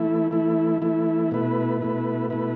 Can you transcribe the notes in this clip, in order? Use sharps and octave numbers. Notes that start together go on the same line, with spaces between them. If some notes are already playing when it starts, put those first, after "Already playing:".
Already playing: E3 A3 E4
E3 A3 E4
E3 A3 E4
B2 A3 E4 B4
B2 A3 E4 B4
B2 A3 E4 B4